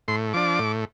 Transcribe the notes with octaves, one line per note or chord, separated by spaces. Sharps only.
A2 C6
F3 D4 D6
A2